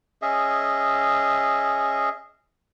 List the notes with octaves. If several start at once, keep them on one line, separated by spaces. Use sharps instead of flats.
C#4 G#4 D#5 E5